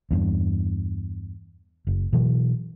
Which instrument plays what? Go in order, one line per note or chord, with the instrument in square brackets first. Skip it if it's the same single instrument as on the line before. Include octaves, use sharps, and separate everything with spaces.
[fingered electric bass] E2 G2
F#1
B2 E3 F#3